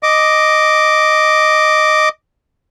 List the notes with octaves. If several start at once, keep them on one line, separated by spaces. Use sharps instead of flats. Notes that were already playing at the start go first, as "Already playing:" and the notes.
D#5 D6